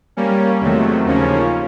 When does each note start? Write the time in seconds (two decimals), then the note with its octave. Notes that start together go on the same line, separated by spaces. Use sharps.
0.17 G3 A#3 C#4
0.61 E2 C3 D#3 F#3 A3
1.05 D#2 C#3 F3 A#3 C#4